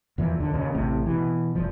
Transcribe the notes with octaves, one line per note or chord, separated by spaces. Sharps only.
E2 A#2 E3 F3
D#2 D3
D#2 A#2 C#3
A1 A2 C3
B2 E3
F1 E2 F3